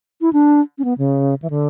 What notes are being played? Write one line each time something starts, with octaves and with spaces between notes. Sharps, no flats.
E4
D4
C#4
B3
C#3
E3
D3